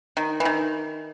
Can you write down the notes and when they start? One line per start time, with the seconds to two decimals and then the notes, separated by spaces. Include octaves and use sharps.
0.17 D#3
0.40 E3
0.45 D#3